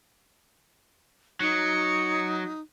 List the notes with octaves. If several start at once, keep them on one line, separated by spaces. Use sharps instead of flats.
F#3 D#4 C#7